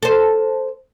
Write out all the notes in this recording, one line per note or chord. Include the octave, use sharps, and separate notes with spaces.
A4 C5